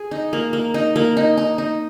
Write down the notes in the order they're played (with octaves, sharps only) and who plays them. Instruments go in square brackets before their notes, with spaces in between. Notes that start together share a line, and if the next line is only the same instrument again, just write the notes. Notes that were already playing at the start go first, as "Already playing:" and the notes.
Already playing: [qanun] G#4
D#4
A#3
A#3
D#4
A#3
D#4
D#4
D#4